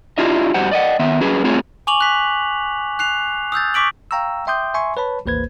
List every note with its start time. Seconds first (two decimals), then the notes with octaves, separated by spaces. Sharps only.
0.18 D4 E4 F4 G4 D#5 E5
0.54 G2 F#4 G4 C5 F#5
0.71 D5 D#5 F#5
0.99 D#3 B3 E5
1.20 F#3 C#4 G#4 B4
1.44 A3 C4 F4 G#4 C#5
1.87 G#5 C#6 D6 F7 F#7
2.01 F#6 B6
2.99 F#6 C7 F7
3.52 D#6 E6 G6 A6
3.74 C#6 D6 B6 D7 F#7
4.11 F5 G5 A#5 C#6 E6
4.47 E5 G5 C6 D6 D#6 G6
4.74 E5 G#5 C6 C#6
4.97 B4 C#5 A5 B5
5.26 A1 D#2 A#3 B4 C5 G#6